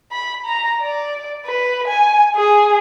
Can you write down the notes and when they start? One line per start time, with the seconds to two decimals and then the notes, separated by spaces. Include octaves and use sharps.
0.12 B5
0.45 A#5
0.81 D5
1.46 B4
1.88 G#5
2.36 G#4